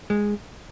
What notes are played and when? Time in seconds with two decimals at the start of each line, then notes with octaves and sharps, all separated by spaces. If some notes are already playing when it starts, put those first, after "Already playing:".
0.10 G#3